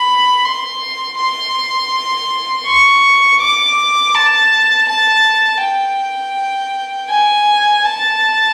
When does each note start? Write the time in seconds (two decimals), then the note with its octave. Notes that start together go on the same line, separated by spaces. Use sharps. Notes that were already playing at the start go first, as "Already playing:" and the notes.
Already playing: B5
0.45 C6
1.19 C6
2.67 C#6
3.41 D6
4.15 A5
4.89 A5
5.62 G5
7.10 G#5
7.85 A5